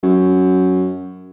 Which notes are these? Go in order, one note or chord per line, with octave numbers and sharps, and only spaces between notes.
F#2